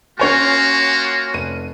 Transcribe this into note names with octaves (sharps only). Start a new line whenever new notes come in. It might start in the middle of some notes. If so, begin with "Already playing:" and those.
A#3 C#4 F4 F#4 C#5 G#5
F1 D#7